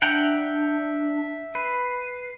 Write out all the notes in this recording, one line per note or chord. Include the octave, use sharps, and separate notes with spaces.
D4 E5 F#5 G5 A#5
B4 C7